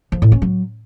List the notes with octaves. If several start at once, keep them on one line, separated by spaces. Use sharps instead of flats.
F3
A2
C#4
F#3